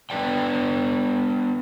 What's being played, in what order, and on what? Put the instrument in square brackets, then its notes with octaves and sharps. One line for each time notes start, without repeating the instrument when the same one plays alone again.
[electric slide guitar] B3 D4 A4 B4 D5 G5